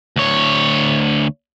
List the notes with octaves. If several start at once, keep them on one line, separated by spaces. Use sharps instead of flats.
D2 C#5